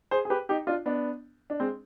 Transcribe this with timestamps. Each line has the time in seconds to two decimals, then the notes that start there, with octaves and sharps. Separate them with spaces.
0.11 G#4 C5
0.25 G#4
0.30 G4 B4
0.49 D#4 G4
0.67 D4 F4
0.86 B3 D4
1.50 D4
1.60 G#3 C4